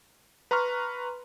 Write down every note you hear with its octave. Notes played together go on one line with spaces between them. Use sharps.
B4 A#5 C6 C#6 F6